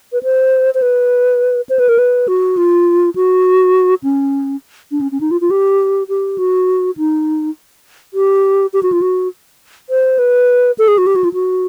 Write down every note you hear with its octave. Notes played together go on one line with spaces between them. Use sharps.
B4
C5
C5
B4
C5
B4
A#4
B4
F#4
F4
F#4
C#4
D4
C#4
C#4
D#4
F4
F4
G4
G4
F#4
D#4
G4
G4
F#4
F4
F#4
C5
B4
A4
G#4
F#4
G4
F#4
F4
F#4